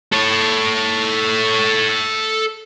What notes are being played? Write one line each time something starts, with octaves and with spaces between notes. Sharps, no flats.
A4 C#5